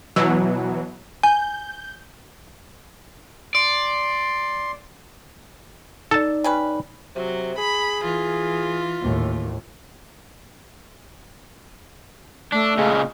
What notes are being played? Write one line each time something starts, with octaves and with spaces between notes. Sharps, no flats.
B2 E3 F#3 E6
G#5 G6
D5 C6
D#4 A4 D5 A5
G3 C#4 B4
C3 F#3
G#4 B5
E3 F4
D#2 A2
A3 D4
A#2 C#3 G#3